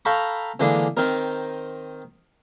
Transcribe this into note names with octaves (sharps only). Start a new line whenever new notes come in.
A4 F5 G5 A#5 B5 C#6
D3 E3 G#3 A#3 D4
D#3 C4 D#4 A#4